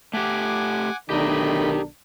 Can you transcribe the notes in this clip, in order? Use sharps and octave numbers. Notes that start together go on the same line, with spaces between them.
A3 G4 F#5 G#5 D6
B1 D#3 A3 D4 G4 A#4 D#5 B5